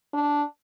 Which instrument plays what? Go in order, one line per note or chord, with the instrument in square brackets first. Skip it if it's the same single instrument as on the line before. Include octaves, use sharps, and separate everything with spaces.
[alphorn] D4